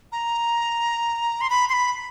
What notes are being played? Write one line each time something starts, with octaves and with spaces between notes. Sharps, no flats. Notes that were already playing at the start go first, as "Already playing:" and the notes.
A#5
C6
B5
C6
B5